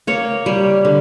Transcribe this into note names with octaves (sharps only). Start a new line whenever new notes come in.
A#3 C#5
G3
D3